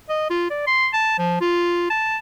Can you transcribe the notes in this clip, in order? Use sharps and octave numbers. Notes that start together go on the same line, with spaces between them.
D#5
F4
D5
C6
A5
F3
F4
A5